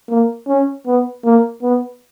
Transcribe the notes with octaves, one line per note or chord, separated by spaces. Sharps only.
A#3
C#4
B3
A#3
B3